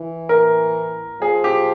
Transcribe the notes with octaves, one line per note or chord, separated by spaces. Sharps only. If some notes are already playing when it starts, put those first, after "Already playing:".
Already playing: E3
A#4
F3 G#4
G4